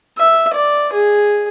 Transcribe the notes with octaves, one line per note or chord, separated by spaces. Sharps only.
E5
D5
G#4